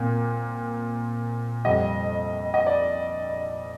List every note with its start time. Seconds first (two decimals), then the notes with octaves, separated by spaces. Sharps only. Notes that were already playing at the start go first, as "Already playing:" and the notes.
Already playing: A#2 C4
1.65 F2 C3 G3 D#5
2.54 D#5
2.67 D5